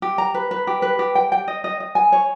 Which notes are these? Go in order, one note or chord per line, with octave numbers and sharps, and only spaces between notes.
G4
A#5
B4
B4
G4
B4
G4
G5
G5
D#5
D#5
D#5
G#5
C#5